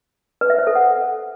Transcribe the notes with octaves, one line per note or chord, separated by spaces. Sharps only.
B4
E5
C5
A4
F#5